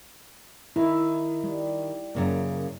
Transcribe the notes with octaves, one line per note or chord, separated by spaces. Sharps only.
D#3 E4
G3
F#2 C#3 A#3